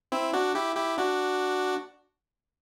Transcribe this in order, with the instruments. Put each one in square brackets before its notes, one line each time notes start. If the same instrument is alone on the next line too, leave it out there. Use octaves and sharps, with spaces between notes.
[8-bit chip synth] C4 E4
D4 F#4
E4 G4
E4 G4
D4 F#4